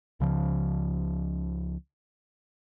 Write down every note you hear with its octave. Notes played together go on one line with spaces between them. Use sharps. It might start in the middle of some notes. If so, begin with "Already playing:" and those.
C#2 C#3 F3